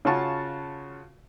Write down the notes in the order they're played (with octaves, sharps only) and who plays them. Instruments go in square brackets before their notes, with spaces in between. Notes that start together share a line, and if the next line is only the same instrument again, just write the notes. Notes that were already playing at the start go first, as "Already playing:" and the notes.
[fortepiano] C#3 C#4 F4 F#4 A5 C#6